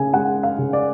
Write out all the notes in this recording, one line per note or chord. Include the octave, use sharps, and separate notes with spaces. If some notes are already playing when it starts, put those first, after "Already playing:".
Already playing: C#3 G#5
G#3 F#5
F5
C#3
D5